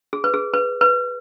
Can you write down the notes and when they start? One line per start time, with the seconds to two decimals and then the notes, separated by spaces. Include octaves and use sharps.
0.13 G#4
0.24 B4
0.34 G#4
0.54 B4
0.81 B4